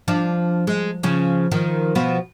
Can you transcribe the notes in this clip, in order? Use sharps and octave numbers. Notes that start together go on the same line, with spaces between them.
F3 D4
G#3
C#3 F3 C#4
D#3 F3
B2 F3 B3